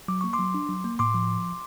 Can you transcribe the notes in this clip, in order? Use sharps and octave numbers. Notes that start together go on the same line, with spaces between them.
F#3 D6
A#3 C#6
C6 D6
F#3
D4
F#3
A#3
A2 C6 D6
F3